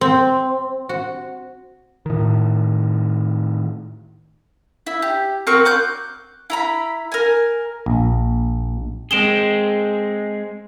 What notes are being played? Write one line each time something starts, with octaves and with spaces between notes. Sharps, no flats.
C4
F#4
A2 D#3
E4
G4
C4 F#4 A#4 C#6
D6 F#6 G6
E4 A#5 B5
A#4 G#5
A#1
G#3 C4 G#4 D7 E7 G7